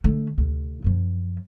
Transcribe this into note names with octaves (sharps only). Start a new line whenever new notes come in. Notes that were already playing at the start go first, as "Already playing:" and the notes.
D3 A3
D2 C3
F#2 F3